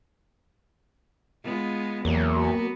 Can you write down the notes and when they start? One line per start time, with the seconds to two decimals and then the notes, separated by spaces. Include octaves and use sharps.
1.43 G#3 B3 F4
2.05 E2 F#3 G3 A#3
2.36 B3 F#4